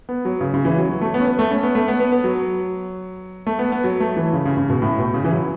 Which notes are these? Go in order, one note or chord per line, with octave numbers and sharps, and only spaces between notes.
B3
F#3
C#3
C#3
E3
F#3
F#3
A3
B3
C#4
B3
A3
C#4
B3
A3
B3
B3
B3
F#3
A3
B3
B3
F#3
A3
E3
C#3
C#3
C#3
B2
A2
B2
C#3
E3
F#3